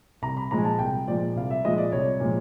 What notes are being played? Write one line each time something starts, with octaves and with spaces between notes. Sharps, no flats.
C2 A#5
B5
A#2 F3 G#3 A#5
G#5
A5
C2 G5
A#2 F3 G#3 D5
C2 F5
E5
A#2 F3 G#3 D#5
D5
C2 C#5
A#2 F3 G#3